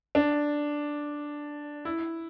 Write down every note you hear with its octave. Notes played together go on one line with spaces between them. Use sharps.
D4
E4